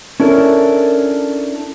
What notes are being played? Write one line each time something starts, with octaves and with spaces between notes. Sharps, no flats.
C#4 D4 E4 A4 A#4